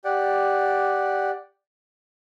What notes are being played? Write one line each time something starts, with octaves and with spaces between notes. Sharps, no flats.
G4 D5 F#5